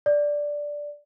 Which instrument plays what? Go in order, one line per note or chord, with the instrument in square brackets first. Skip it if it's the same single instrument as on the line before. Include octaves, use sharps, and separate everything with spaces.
[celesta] D5